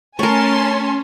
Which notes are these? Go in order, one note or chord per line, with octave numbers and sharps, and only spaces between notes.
A3 C#4 A#4 C#5 G#5 A5 C6